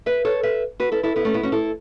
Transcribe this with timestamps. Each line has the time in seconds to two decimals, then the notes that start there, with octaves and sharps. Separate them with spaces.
0.06 B4 E5
0.25 A4 C#5
0.43 B4 E5
0.80 F#4 B4
0.92 E4 A4
1.03 E4 A4
1.16 B3 E4
1.25 A3 C#4
1.34 B3 E4
1.43 C#4 F#4
1.52 E4 A4